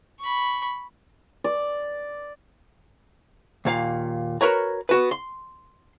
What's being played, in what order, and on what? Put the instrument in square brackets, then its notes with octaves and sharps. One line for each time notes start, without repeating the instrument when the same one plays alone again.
[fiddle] B5 C#6
[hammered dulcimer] D5
[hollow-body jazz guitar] D#2 A#2 F5
F#4 A#4 B4 C#5 A#5
B3 F#4 B4
C6